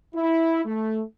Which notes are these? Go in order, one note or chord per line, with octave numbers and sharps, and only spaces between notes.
E4
A3